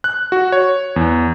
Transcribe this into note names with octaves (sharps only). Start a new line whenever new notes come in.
F#6
F#4
C#5
E2